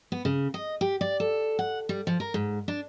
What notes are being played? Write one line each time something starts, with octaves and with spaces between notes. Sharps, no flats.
B3
C#3
D#5
G4
D5
A4
F#5
G3
F3
A#4
G#2
D4